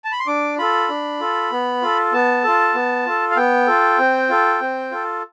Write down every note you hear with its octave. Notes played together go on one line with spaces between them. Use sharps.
A5
B5
C6
D4 D6
F4 A4 B5
D4
F4 A4
B3
F4 A4
B3 A5
F4 A4
B3
F4 A4
F5
B3 G5
F4 A4
C4
F4 A4
C4
F4 A4